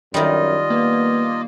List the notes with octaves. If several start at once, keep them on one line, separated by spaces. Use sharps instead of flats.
F#2 D#3 G3 F4 D#5
A#3 B3